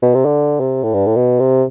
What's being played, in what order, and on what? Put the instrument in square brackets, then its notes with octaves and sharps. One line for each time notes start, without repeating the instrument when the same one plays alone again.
[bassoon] B2
C3
D3
C3
A2
G2
A2
B2
C3